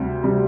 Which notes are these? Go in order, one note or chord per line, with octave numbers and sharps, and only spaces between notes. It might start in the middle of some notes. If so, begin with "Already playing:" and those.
Already playing: D2 C3 G3
C3 G3